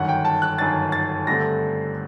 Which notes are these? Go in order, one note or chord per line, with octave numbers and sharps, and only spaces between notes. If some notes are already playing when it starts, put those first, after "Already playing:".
Already playing: G1 F#2 D#3 F#5
G5
A5
F#6
G1 F#2 D#3 A6
A6
G2 D3 A3 C4 A#6